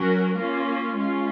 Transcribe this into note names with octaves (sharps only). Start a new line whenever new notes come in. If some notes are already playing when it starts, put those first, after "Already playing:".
Already playing: F#3 C#4 F#4 A#4
A#3 C#4 F4
G#3 C#4 F4